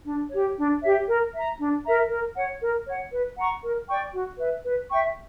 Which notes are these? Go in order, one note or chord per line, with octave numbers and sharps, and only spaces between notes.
D4
G4 C#5
D4
G4 C#5 E5
A#4
E5 A#5
D4
A#4 E5 A#5
A#4
C#5 F#5
A#4
C#5 F#5
B4
F#5 A#5 C#6
A#4
D5 G5 C#6
F#4
B4 E5
B4
E5 G5 C#6